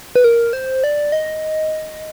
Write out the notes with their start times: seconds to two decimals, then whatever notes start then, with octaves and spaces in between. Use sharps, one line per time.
0.16 B4
0.24 A#4
0.53 C5
0.84 D5
1.12 D#5